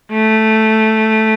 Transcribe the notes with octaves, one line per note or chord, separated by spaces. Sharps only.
A3